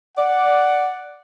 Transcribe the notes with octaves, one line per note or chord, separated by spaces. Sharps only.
D5 F#5